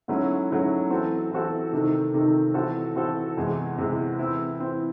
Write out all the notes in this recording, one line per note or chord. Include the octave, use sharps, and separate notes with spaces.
G#2 F#3 A3 C#4 E4
G#2 F#3 A3 C#4 E4
E3 C4 F#4 A4
E3 C4 F#4 A4
C3 D#3 A3 D#4
C3 D#3 A3 D#4
E3 C4 F#4 A4
E3 C4 F#4 A4
E2 C3 E3 G#3
E2 C3 E3 G#3
E3 C4 E4
E3 C4 E4